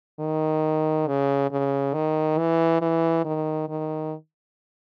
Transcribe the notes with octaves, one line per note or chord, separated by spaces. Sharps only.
D#3
C#3
C#3
D#3
E3
E3
D#3
D#3